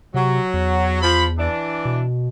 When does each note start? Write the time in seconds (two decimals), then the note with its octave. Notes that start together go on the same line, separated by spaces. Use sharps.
0.14 C3 F#3
0.54 E2
1.02 F3 B5
1.38 E3 D4
1.85 B2